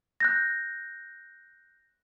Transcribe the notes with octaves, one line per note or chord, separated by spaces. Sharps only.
F#6 G6 A#6